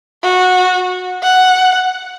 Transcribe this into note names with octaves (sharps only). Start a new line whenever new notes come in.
F#4
F#5